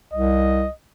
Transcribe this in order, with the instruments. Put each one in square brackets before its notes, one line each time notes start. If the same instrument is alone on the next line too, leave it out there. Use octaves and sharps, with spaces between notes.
[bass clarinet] C2 [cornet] D#5